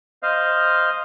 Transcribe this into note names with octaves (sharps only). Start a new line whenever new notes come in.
C5 D#5 F5